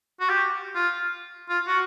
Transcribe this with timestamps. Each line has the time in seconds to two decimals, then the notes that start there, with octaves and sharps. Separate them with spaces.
0.20 F#4
0.29 G4
0.75 F4
1.49 F4
1.67 F#4